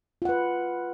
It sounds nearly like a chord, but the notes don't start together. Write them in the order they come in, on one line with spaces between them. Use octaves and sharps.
F4 F#5 B4